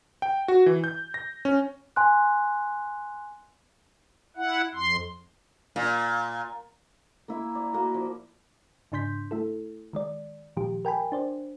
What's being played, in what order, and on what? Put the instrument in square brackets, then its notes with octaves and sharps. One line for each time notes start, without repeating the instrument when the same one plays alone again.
[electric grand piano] G5
F#4
E3
G6
A#6
C#4
[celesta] G#5 C6 F#6
[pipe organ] E4 F#5
F2 C6
[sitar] A#2
[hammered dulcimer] A#3 E4 E5
D5
A#3 F#4
F3
[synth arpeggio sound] G#2 C#3 D4 C6 G6 B6
A3 E4 A4
D#3 G#3 D5
A#2 D#3 F3 G#3 G4
A#4 G5 G#5 B5
D4 C5 D5